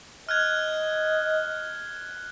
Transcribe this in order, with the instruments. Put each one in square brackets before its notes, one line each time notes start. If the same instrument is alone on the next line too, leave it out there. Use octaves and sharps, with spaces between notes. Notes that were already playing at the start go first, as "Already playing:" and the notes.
[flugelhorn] D#5 [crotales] F6 F#6 G#6